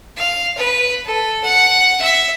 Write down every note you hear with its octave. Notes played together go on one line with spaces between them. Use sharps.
F5
B4
A4
F#5
E5